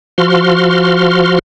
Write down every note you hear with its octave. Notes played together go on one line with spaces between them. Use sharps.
F3 F#4 C6 F6